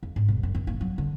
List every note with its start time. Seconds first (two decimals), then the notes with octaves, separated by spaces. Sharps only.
0.03 F2
0.16 G#2
0.28 E1
0.43 F#2
0.55 D#3
0.67 A#3
0.81 F#3
0.98 D3